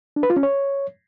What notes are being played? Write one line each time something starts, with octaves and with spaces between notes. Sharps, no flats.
D4
B4
F4
C#4
C#5